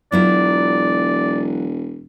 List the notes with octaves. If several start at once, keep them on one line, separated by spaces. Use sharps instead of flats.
E1 F#3 E4 F4 D5